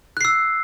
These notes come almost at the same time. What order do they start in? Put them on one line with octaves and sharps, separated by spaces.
F#6 C7 E6